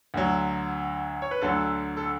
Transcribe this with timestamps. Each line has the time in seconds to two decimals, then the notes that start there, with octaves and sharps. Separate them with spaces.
0.14 D2 D3 F#3
1.22 C#5
1.31 B4
1.41 D2 D3 F#3 A4
1.97 A4